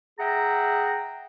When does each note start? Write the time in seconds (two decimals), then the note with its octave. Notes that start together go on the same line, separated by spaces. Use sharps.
0.19 G#4 E5 F#5 G5 A#5